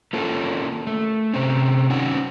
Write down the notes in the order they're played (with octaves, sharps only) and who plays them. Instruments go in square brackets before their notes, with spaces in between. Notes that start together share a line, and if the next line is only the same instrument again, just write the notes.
[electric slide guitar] A#3 C#4 F4 A4
A3
C3 C4 C#4
C#4 D#4 F#5